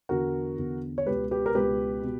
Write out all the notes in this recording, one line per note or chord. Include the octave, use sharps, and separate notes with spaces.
E2 D3 F#4 A#4
E2 D3
C#5
C#2 B2 G4 B4
G4 B4
A#4
C#2 B2 G4 B4
B2